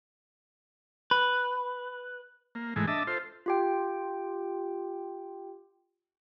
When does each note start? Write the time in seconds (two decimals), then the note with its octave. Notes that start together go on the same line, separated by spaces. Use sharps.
1.11 B4
2.55 A#3
2.76 G#2 E3 G#3 A3
2.88 D4 D#5 E5 A5
3.07 F4 A4 C5
3.46 F4 G4 G5